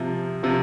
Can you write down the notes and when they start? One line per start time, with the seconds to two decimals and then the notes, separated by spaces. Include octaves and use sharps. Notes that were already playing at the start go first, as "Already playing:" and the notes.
Already playing: C3 F3
0.43 C3 F3